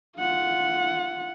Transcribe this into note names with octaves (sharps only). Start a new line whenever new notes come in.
F4 F#5